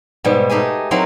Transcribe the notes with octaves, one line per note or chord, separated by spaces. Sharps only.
G#2 B2 G3
A3 D#4 G4 G#4 G#5
F#3 C4 D#4 E4 A#4 F5